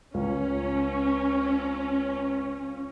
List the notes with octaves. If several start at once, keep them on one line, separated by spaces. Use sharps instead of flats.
C#2 C#4